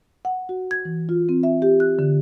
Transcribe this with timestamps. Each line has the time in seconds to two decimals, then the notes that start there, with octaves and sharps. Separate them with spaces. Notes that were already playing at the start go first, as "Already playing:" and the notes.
0.25 F#5
0.49 F#4
0.71 G#6
0.85 E3
1.09 F4
1.29 C4
1.43 E5
1.62 G4
1.80 F#6
1.99 D3